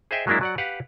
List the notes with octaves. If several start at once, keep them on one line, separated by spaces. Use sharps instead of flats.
G#4 C5 D#5 E5 G5
F#3 G#3 A#3 D4 E4
F#3 D5 F#5
G4 B4 F5 F#5